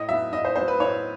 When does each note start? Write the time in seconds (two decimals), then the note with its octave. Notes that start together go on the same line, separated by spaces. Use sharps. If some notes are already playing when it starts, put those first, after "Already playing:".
Already playing: A2 D#5
0.08 F#3 B3 E5
0.32 A2 D#5
0.45 C5
0.56 F#3 B3 C5
0.68 B4
0.80 A2 C#5